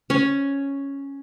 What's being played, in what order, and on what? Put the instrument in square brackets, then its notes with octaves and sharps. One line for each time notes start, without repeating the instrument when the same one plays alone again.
[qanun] C#4